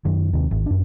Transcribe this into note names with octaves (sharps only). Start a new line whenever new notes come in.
F#2 D#3
D#2 C3
G#1
F#2 D4